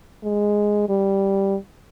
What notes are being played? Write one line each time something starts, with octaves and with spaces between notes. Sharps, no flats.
G#3
G3